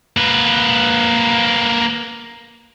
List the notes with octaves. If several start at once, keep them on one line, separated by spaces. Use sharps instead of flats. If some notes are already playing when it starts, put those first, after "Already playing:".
A#3 B4